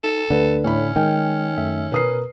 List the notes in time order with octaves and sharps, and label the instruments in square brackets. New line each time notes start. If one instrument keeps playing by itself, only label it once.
[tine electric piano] D#4 [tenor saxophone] A4
[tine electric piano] D2 A3 [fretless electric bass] D3 [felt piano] B4
[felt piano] A2 C#5 B5 [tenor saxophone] C#4
[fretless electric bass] D#3 [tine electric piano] G#3 G#5 F6 [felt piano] G5
[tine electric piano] F#2 A3 E5
[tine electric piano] B2 A#4 [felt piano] B4 D#6 C7